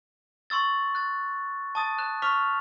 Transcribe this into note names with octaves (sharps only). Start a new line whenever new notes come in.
C6 C#6 E6 A6
F#6 A6
A5 D#6 A6
F#6 E7
C#6 D6 F6 B6 F7